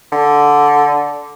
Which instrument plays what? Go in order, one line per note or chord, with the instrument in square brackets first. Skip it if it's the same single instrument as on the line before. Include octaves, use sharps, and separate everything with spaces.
[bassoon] D3